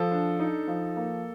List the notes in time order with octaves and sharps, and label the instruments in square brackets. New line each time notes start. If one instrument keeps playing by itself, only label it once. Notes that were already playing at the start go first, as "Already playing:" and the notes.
Already playing: [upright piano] F3 [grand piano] A4
[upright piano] D4
D#4
F3
A#3